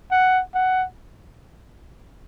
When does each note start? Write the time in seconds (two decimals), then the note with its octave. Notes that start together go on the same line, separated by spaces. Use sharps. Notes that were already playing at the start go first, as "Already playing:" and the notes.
0.11 F#5
0.55 F#5